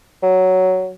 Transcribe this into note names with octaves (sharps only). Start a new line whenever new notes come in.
F#3